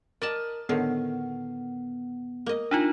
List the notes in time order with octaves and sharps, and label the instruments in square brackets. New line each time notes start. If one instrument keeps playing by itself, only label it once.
[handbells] A#4 [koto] D5 D#5 A5
[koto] A2 D3 D#3 [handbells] B3
[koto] A#3 D#5
[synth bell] D4 D#4 F4